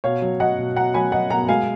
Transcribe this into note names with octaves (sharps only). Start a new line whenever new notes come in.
B2 C#5 F5
F#3
F#3 D#5 F#5
B2
B2 F#5 A#5
F#3 G#5 B5
F#3 D#5 F#5
B2 F#5 A#5
G#3 F5 G#5